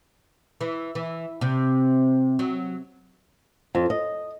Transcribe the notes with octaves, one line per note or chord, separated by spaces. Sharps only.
E3
E3
C3
F#3
F2
D#5